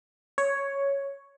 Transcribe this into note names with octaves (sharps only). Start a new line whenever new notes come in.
C#5